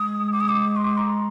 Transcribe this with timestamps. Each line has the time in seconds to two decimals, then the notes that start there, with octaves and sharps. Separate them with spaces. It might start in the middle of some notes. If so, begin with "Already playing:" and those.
Already playing: G#3 D#6
0.32 D6
0.41 D#6
0.49 D6
0.76 C6
0.98 A#5